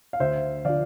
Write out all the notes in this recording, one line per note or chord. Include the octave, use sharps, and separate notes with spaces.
F5
D2 C5 E5
D3 F3 D5 F5